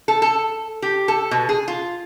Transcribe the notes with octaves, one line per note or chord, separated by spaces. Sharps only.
A4
A4
G4
A4
B2
G#4
F4